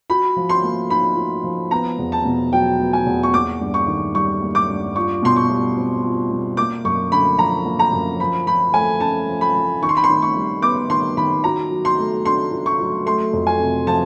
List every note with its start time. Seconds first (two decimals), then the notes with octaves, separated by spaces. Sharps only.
0.10 F#4 B5
0.37 F3
0.49 C6
0.64 A#3
0.90 D#4 B5
1.17 F#4
1.44 F3
1.71 B3 A#5
1.99 E2
2.12 A5
2.25 B2
2.53 F#3 G5
2.80 B3
2.93 G#5
3.06 E2
3.23 C#6
3.33 A#3 D6
3.61 G2
3.74 C#6
3.87 D#3
4.15 G3 C#6
4.42 A#3
4.55 D6
4.69 G2
4.96 F4 C#6
5.23 B2 C6
5.36 C#6
5.50 G3
5.77 C4
6.04 F4
6.31 B2
6.57 A#3 D6
6.85 F#2 C#6
7.11 D3 B5
7.39 F3 A#5
7.66 A#3
7.79 A#5
7.93 F#2
8.20 F3 B5
8.47 F3 B5
8.74 A3 G#5
9.00 C#4 A5
9.29 F3
9.41 B5
9.55 F3
9.82 D#3 C#6
9.89 C6
9.97 B5
10.04 C6
10.09 D#3
10.22 C#6
10.36 G3
10.62 B3 D6
10.90 D#3 C6
11.17 D#3 B5
11.44 F#4 A#5
11.71 F#3
11.85 C6
11.98 A3
12.25 D4 C6
12.52 F#4
12.66 C#6
12.80 F#3
13.06 A3 C6
13.33 F2
13.47 G#5
13.60 C3
13.87 F3 A5